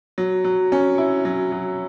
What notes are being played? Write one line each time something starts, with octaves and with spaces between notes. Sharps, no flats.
F#3
F#3
C#4
E4
F#3
F#3